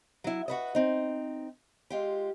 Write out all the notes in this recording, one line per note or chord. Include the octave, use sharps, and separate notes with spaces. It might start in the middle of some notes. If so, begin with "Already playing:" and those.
F#3 E4
F#4 B4 D#5
C4 D#4
G#3 F4 G4